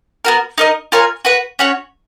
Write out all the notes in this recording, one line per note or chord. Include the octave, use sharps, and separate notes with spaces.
B3 F#4 A#4
D#4 A#4 D#5
F4 A#4 C#5 G#5
F#4 B4 F#5
C#4 F#4 C#5